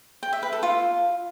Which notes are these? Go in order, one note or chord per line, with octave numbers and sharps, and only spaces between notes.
G5
E5
B4
A4
F4